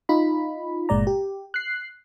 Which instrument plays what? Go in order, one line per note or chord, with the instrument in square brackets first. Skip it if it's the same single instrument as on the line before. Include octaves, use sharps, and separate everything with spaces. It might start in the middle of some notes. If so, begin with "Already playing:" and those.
[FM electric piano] D#4 F4 B5
G1 A#2 G#3 D5 A#5
G4
F#6 C7